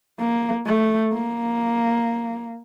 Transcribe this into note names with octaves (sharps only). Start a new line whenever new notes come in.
A#3
A3
A#3